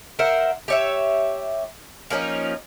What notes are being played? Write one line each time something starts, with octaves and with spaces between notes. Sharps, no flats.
A#4 C5 E5 F#5
G4 C#5 E5
F3 A#3 C#4 D#4